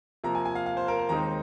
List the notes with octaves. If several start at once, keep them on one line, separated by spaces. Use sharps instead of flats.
C3 F3 A#3 A#5
G#5
G#5
F5
F5
C5
A#4
C5
D#2 D#3 G#3 C4 D#4 A#5